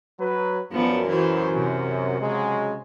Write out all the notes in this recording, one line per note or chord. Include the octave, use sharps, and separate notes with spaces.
F#3 B4
F#2 F3 B3 D4
E3 F#3 C5
C3
C#3 F#3 G#3